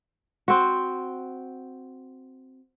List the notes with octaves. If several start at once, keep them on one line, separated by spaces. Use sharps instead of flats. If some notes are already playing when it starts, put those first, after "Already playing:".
C4 F#4